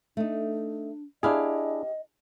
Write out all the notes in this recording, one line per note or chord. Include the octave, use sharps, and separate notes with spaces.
A3 D4 D#4
D4 E4 G4 G#4 D#5 F5